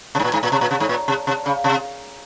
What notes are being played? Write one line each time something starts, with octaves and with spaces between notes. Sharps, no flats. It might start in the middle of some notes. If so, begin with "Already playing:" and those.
C3
G#2
A#2
G#2
A#2
C3
A#2
C3
G#2
A#2
C3
C3
C#3
C3